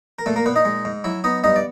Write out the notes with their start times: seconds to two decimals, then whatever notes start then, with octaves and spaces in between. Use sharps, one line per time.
0.19 A#4
0.26 A#2 A3 A4
0.36 A#3 A#4
0.46 A#2 B3 B4
0.56 D#4 D#5
0.65 G#3
0.85 G#2
1.04 F#3 E4 E5
1.24 B3 D#4 D#5
1.44 G2 D#4 D#5
1.56 D5